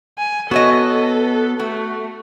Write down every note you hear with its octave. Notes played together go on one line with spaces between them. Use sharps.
G#5
B3 F#4 A4 C#5 D#5
A3 F#4